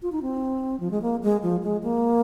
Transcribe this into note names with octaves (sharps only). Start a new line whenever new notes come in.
F4
D#4
C4
F3
G#3
A#3
G#3
F3
G#3
A#3